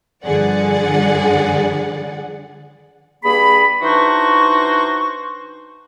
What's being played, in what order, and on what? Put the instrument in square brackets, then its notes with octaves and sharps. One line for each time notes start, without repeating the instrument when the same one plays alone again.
[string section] G2 D3 F3 G#4 D5 F#5
[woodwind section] G2 A#3 G#4 B5
E3 D4 D#4 F#4 C5 C#6